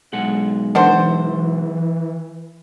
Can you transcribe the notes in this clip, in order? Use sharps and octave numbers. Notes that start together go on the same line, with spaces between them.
B1 G#3 F#5
E3 D4 F#4 C5